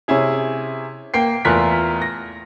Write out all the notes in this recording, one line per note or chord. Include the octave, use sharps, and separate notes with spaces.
C3 C#4 E4 G#4
A#3 G5 C7
E2 A3 F4 A#4 F#6 B6
A#6